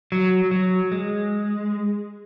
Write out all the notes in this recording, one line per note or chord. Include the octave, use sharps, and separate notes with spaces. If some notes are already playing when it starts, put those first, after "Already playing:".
F#3
F#3
G#3